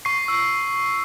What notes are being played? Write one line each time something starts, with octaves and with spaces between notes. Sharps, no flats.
C#6 C7
E6